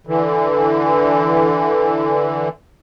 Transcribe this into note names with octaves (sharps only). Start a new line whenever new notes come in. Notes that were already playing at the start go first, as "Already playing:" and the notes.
D3 E3